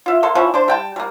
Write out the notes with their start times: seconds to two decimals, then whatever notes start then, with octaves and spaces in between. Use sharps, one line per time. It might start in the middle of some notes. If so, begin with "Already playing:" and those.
0.06 F4 E5
0.23 A#3 A4 C6
0.35 E3 F3 C#4 E4
0.54 D4 C5
0.68 G3 G5 A5
0.96 G3 A#3